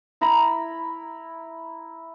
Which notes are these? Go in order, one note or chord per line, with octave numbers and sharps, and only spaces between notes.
E4 A#5 B5